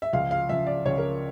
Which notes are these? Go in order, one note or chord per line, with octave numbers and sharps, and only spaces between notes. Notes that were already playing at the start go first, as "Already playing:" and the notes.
E5
C#2 C#3 F3 F5
F5
C#2 C#3 F3 E5
D5
C#2 C#3 F3 C#5
A#4